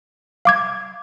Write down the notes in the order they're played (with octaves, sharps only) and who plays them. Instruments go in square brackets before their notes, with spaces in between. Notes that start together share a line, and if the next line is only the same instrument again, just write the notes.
[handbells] F5 D6 G#6